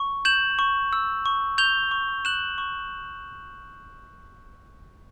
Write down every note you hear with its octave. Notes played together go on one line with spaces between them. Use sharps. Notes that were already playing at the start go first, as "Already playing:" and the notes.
Already playing: C#6
G6 E7 F#7
C#6
E6
C#6
G6 F7 G7
C#6
F#6 E7 F#7
C#6